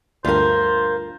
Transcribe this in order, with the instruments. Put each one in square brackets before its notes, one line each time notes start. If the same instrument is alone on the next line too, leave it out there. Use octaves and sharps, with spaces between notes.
[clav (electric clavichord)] D2 G2 [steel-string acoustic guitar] F4 A#4 [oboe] C5